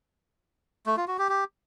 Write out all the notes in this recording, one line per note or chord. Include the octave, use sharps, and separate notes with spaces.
A3
F4
F#4
G4
G4